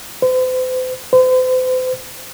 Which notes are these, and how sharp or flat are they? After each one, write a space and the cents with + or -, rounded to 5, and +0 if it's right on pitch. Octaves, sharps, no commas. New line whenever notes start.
C5 -40
C5 -40